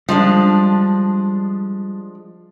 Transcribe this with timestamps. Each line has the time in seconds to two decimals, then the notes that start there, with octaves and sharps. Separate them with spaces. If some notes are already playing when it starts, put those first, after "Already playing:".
0.09 F3 G3 G#3 D4